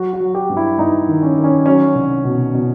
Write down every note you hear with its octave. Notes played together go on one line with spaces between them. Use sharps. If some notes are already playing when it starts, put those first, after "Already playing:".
Already playing: F#3 F#4
F#4
F#3
G4
G2
E4
G2 D#4
D#3
C#4
D#3
C#4
F#3 C#4
C2
B2
B2